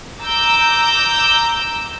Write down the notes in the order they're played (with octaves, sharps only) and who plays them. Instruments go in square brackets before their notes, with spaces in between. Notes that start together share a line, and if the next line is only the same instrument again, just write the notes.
[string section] A#5 D6 E6 G6